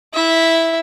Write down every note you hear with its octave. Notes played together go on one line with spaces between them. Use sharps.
E4 E5